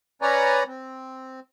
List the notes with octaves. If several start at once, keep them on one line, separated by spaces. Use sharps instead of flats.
C#4 B4 C#5 D5 G#5 A#5
C4